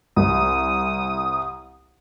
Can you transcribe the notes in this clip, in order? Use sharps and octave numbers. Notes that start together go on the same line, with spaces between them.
C2 D#6